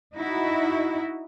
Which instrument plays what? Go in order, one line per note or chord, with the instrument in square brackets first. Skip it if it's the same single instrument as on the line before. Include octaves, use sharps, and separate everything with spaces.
[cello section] D#4 E4 F#4